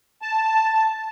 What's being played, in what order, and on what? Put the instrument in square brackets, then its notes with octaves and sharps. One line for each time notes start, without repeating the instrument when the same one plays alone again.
[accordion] A5